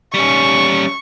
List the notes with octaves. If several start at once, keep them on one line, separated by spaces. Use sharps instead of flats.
G3 C#4 C#6